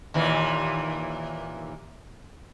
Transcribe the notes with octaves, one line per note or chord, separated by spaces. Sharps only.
D#2 A#2 E3